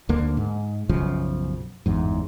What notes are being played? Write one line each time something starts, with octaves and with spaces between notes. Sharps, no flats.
D2 D3 A#3
G#2
B1 F#2 C#3 F3
G1 E2 G#2